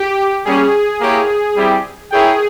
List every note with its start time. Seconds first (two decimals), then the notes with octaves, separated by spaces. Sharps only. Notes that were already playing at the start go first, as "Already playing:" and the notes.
Already playing: G4
0.45 G3 A#3 C#4 G#4
1.00 A#3 E4 G4 C#5 G5
1.56 G3 C4 E4 G4
2.12 E4 G#4 A#4 C#5 G5